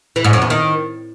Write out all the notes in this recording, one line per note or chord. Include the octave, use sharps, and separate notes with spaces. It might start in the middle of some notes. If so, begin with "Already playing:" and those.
E3
G#2
F#2
E2
D#3